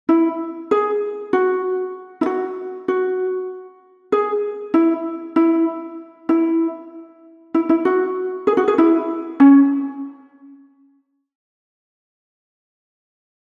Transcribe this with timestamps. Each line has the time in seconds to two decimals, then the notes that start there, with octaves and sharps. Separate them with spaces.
0.09 E4
0.71 G#4
1.33 F#4
2.21 E4
2.26 F#4
2.88 F#4
4.12 G#4
4.74 E4
5.36 E4
6.29 E4
7.54 E4
7.69 E4
7.85 F#4
8.47 G#4
8.57 F#4
8.68 G#4
8.78 E4
9.40 C#4